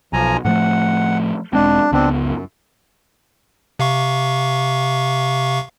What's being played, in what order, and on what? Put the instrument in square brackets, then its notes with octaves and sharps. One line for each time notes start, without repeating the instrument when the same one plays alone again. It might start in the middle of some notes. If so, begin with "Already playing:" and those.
[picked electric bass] B1 [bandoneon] F3 G#5 A#5
[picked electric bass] A2 F3 A3 [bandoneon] F#5
[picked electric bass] E1 G#3 C4 [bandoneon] D4
[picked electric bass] C#2 B3 [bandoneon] C4 D4
[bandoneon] F#2
[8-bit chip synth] C3 F5 C#6